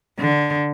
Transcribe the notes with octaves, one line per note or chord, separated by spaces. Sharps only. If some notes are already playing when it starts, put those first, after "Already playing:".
D3